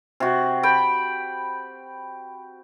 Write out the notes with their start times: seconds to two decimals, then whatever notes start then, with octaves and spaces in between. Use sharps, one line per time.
0.20 C3 F#4
0.63 G5 B5